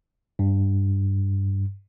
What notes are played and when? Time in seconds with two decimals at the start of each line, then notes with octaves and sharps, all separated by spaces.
0.39 G2